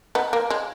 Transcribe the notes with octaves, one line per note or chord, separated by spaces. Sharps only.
B3 D#4
A#3
G#3